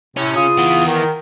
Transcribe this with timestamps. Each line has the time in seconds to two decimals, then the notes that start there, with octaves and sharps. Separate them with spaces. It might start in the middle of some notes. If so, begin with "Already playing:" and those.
0.17 A2 C3 C#4
0.37 C#3 F4 D#6
0.58 E3 B3
0.86 D#3